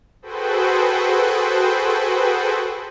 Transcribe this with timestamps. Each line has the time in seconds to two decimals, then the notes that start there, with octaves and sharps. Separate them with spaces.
0.22 F#4 G#4 A4 B4 C5 G5